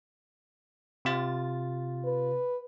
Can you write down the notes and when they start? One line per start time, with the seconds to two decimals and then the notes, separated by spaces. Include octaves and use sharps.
1.05 C3 F4 A6
2.04 B4